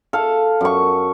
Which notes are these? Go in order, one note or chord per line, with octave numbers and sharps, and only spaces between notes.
A4 F5
F#2 C#6